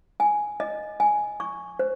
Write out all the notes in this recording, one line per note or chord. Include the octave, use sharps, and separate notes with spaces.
G#5
D#5
G#5
C#6
C5